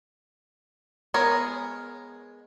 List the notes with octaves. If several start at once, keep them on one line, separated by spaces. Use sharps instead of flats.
G#3 B3 A#4 C#5